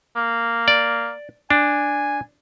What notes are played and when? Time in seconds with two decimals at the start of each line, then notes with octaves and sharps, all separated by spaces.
0.16 A#3
0.68 D5
1.50 D4 G#5